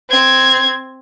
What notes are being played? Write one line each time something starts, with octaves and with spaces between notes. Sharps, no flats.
C4 G#6